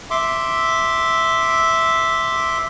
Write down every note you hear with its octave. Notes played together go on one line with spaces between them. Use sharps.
E5 C6 D6